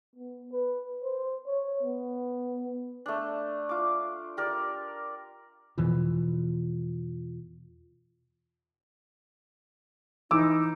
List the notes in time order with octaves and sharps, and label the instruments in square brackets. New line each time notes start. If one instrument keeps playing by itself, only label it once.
[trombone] B3
B4
C5
C#5
B3
[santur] A3 D4
F4 D6
G4 A#4 D5
[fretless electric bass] E2 B2 E3 F3
[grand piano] E3 D6 E6 [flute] D#4